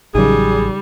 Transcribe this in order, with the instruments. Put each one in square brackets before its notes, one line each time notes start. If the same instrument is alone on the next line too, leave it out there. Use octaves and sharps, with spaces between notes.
[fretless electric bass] A1 F#3 [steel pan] C#3 D#4 [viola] G3 [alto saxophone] G#4